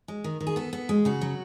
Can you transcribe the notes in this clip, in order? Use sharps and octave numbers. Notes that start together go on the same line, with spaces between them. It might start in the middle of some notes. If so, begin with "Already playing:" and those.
G#3
D#3
D#3
G#4
B3 A4
B3
G#3
C#3 F#4
F#3